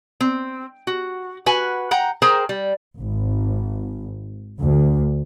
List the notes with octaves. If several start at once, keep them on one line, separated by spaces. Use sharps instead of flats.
C4
F#4
F#4 B4 G#5
F#5 G5 A#5
G#4 A#4 C5 G5 A#5
G3
G#1
D2